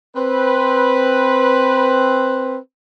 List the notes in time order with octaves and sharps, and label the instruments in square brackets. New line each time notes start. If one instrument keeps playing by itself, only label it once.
[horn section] C4 B4